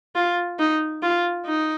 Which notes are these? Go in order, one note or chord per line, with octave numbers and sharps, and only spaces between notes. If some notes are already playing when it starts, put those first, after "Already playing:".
F4
D#4
F4
D#4